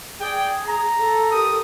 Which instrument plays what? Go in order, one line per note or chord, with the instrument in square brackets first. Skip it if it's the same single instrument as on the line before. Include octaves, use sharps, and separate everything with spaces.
[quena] G#4 [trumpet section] D5 G5
[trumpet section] A#5
[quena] A4
[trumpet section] G4 A#4 D#6